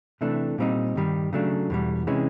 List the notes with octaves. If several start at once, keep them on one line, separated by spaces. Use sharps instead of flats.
C3 E3 A3 D4
A#2 G3 C4 D#4
G2 D#3 G3
C#3 F#3 A3 D4
E2 B2 G3
C3 E3 G#3 C#4